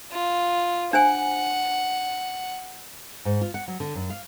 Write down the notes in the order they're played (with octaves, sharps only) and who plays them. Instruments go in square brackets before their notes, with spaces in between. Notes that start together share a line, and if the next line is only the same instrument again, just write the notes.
[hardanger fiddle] F4
[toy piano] D4 C5 G#5 [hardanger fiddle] F#5
[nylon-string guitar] G#2
F4
F#5
F#3
D3
F#2
F5